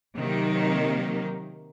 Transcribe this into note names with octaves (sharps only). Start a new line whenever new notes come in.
C3 D#3 F#3 A#3 D#4